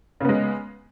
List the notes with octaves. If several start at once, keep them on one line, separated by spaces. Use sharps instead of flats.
C#3 G#3 B3